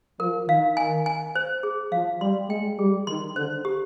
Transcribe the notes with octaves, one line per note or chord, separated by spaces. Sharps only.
F3 A#4
D#3 F5
G#5
G#5
C5
G#4
F3 F5
G3 C6
G#3 G5
G3 G#4
D#3 C6
D3 C5
G4